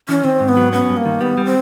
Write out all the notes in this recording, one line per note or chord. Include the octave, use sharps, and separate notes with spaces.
E3 C#4
D#3 C4
G#2
B3
F#3
B3 C#4
G2
A#3
D#3
G3 B3
G3
C4